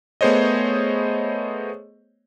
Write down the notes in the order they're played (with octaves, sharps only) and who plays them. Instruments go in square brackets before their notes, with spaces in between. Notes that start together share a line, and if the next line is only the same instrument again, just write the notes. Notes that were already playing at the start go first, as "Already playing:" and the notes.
[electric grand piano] A3 B3 G#4 C5 C#5 D#5